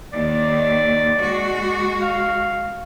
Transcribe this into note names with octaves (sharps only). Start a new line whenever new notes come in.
D#2 D#3 D5
G#3 F#4
F5